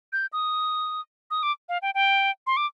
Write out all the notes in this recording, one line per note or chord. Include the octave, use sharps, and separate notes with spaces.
G6
D#6
D#6
D6
F5
G5
G5
C6
D6